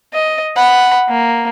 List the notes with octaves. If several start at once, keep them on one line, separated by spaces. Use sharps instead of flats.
D#5
F#5 B5
A#3